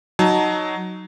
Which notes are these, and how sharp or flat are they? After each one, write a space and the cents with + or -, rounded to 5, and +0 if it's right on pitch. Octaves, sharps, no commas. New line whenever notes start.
F#3 +0 D#4 +0 A5 +0